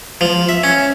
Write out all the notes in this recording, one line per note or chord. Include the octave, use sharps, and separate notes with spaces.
F3
E5
C#4